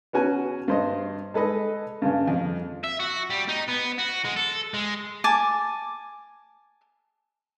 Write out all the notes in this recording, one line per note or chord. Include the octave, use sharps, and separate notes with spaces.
B3 C#4 F#4 G#5
G2 C5 D#5
G#3 A4 B4 D#5
G2 C#3
F2
E5
F#4
G3
D#4
B3
F#4
G#3
A4
G#3
G#5 A5 D6